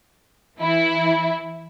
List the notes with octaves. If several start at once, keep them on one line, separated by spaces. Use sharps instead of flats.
E3 E4